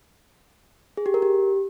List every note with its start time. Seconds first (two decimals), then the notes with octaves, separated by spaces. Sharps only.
0.97 G#4
1.06 G4
1.14 A#4
1.22 G4